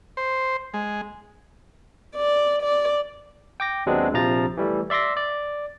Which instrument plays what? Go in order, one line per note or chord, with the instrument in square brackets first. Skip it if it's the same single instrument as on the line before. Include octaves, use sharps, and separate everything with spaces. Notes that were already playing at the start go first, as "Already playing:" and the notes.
[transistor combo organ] C5
G#3
[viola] D5
D5
[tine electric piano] G5 D6 A#6
D#2 F#3 G#3 B3 C4 D4
A#1 C3 F3 A#5 A6
E3 G3 A3
D5 E5 C6 D6 A#6
D5